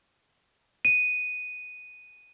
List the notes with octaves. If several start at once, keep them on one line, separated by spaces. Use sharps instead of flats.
D#7